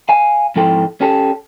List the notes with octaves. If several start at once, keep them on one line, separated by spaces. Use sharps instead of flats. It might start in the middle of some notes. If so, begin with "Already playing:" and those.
F5 G#5
G#2 F3 C4 E4 A4 G5
C#4 G4 A4